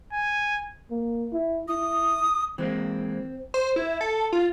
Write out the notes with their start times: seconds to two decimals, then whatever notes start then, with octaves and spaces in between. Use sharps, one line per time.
0.13 G#5
0.91 A#3
1.33 E4
1.68 E4 D#6
2.58 E3 G#3 A#3 C4
3.54 C5
3.76 E4
4.01 A4
4.33 F4